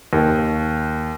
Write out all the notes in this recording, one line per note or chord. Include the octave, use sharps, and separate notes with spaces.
D#2